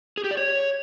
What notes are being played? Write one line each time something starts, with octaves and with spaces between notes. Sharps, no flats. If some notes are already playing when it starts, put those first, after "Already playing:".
G#4
G4
D5
C#5